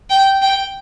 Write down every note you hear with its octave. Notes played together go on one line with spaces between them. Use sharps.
G5
G5